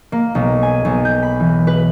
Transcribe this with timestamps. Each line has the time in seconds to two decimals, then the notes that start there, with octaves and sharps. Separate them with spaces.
0.12 A#3
0.35 B1
0.63 G#5
0.85 B1
1.05 G6
1.23 B5
1.40 E3
1.67 B4